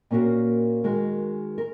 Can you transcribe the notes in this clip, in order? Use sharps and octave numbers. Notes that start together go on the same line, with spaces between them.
A#2 A#3 C#4 F#4 A#4
D#3 G#3 F#4 A#4
A#4